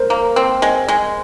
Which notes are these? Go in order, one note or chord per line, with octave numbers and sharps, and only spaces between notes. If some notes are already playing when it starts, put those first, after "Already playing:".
Already playing: A#4 C5
A#3
C4
G#3
G#3